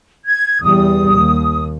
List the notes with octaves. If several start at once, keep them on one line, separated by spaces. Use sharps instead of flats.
G#6
E2 G3 D#6
D#2